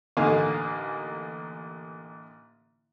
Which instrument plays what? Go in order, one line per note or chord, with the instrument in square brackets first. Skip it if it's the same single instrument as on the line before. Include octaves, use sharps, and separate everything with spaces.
[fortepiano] A1 D3 A#3 D#4 F5 G#5